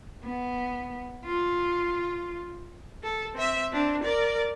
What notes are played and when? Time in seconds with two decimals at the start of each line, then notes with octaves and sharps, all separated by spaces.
0.24 B3
1.25 F4
3.03 A4
3.35 C4 E5
3.73 C4 D4
4.03 A#4 D5